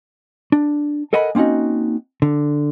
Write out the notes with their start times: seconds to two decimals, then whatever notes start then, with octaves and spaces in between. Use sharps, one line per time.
0.52 D4
1.13 A4 A#4 D#5 F#5 G#5 B5
1.35 A#3 C4 C#4 D#4 F#4
2.22 D3